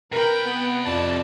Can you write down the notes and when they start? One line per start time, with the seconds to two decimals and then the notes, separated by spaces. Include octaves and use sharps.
0.12 C3 A#4 B4 G5 B5
0.45 B3
0.85 F2 D5 A5